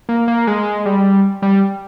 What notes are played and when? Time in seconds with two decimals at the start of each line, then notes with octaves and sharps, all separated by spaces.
0.09 A#3
0.28 A#3
0.47 G#3
0.85 G3
1.42 G3